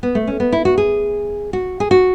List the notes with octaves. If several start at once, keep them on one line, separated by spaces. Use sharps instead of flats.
B3
A3
C#4
B3
E4
F#4
G#4
F#4
G#4
F#4